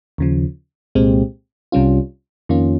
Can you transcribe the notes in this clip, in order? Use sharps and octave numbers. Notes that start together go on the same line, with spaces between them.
D#2 C#3 F3
C2 A#2 G#3 C4 G4
C2 C3 G3 C#4 F4
F2 D#3 A#3 C#4 F4